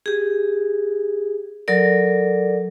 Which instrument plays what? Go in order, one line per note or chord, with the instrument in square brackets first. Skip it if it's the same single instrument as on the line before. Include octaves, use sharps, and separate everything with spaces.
[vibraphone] G4 G#4
F#3 A4 A#4 D5